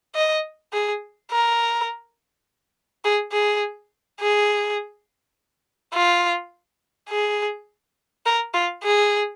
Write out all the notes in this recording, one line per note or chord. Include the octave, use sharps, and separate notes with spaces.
D#5
G#4
A#4
G#4
G#4
G#4
F4
G#4
A#4
F4
G#4